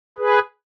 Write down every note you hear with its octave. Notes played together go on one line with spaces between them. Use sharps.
G#4 B4